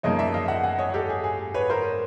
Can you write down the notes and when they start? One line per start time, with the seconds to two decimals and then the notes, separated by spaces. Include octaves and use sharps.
0.03 F#2 C#3 F3 A#3 D#4 C#5 D#5
0.18 D5 E5
0.34 D#5 F5
0.48 E5 F#5
0.63 F#5 G#5
0.78 C#5 D#5
0.94 G4 A4
1.09 G#4
1.24 G#4
1.54 B4 C#5
1.70 A#4 C5